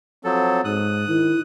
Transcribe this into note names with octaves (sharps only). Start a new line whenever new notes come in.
F3 F#3 C4 A4
G#2 D#6 F#6
D#3 E4